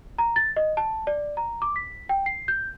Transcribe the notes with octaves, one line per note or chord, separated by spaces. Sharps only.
A#5
A6
D#5
A5
D5
A#5
D6
B6
G5
C7
G6